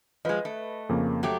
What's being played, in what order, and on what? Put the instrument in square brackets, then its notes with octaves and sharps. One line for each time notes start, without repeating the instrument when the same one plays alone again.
[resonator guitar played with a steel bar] F3 G#3 [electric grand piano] B4 D#5
[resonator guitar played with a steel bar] A3
[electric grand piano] F2 C#3 A#3
[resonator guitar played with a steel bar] F#3 A3 G4